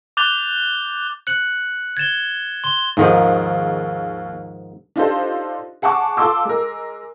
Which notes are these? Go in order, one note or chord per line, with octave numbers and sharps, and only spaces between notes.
D6 F#6 G6 A6 F7 G7
F#6 C#7 F#7
G#6 A6 E7 G7
C6 G7
D#2 G#2 D#3 F3 G#3
D4 D#4 F4 G4 A4 C5
G#4 F#5 A5 C#6 D6
F4 A4 A5 C6 D6 E6
G#3 A#4